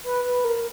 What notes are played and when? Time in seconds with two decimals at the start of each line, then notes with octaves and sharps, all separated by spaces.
0.04 B4
0.24 B4
0.44 A#4